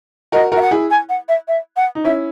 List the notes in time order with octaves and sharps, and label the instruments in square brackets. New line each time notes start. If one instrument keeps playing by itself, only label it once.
[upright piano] F#4 A#4 [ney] D#5
[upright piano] F#4 A#4 [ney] E5
[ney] F#5
[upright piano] E4 G#4
[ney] G#5
F#5
E5
E5
F#5
[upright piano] D#4
[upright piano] C#4 E4 [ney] E5